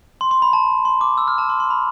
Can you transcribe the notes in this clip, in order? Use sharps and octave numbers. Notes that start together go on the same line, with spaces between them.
C6
C6
B5
A5
C6
D6
E6
F6
A5
C6
C6
B5